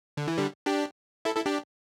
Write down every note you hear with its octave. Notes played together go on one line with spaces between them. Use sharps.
D3
E3
D3 G3
D4 G4
E4 A4
E4 A4
D4 G4